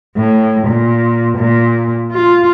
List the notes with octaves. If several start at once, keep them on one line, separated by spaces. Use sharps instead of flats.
A2
A#2
A#2
F4